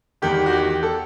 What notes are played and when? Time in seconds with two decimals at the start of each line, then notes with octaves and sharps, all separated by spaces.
0.22 E2 D#3 G4
0.46 F#4
0.53 G4
0.83 A4